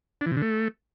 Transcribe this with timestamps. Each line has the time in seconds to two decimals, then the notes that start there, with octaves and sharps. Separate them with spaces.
0.21 D4
0.26 E3
0.32 C3
0.37 D3
0.42 A3